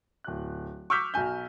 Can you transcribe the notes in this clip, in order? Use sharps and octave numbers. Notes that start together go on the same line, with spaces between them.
D1 F#6
C#6 D6 E6 F6 G6 B6
B1 F#4 G#5 G6